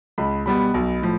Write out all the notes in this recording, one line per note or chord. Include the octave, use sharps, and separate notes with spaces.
C#2 B5
B2 G3 B3 B5
B1
A2 F3